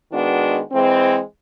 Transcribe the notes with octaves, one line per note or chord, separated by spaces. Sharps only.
D#3 G#3 B3 D4 F#4
E3 G#3 C4